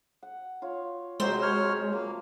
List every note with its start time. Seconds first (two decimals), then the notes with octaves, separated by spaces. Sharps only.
0.23 F#5
0.62 F4 C#5
1.20 C3 F#3 G#3 C5 B5
1.42 C#5 F6
1.93 F3 A#3